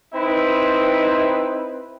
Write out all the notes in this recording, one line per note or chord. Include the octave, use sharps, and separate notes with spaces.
C4 D#4 E4 B4